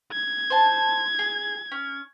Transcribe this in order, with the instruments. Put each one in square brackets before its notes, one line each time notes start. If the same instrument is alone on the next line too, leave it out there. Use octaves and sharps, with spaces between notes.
[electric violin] G#6
[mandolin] C5 A5
G#4
C#4